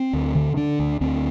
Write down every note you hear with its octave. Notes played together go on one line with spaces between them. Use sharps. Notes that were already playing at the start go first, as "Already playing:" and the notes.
Already playing: C4
D2
D3
D3 D4
D2
D2 C4